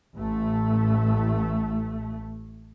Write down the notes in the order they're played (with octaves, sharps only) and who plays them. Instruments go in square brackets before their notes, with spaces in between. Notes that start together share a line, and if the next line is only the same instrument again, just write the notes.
[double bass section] A1 A3